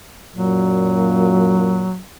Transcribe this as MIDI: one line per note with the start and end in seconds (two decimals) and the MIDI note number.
0.36 1.94 42
0.36 1.94 46
0.36 1.99 54